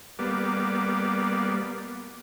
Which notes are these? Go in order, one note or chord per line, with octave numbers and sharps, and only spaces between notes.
G3 A#3 B3 D5